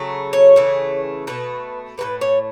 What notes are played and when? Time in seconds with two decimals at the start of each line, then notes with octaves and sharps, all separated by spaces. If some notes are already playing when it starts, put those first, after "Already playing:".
Already playing: C#3 F#3 A3
0.33 C#5
0.56 C#3 E3 A3
1.27 B2 A3 B4
1.98 A2 F#3 A3 B4
2.21 C#5